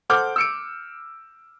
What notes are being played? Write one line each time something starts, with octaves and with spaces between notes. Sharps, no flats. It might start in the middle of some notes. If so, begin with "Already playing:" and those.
A4 C5 F#5 D6 F6 G6
E6 C#7 D7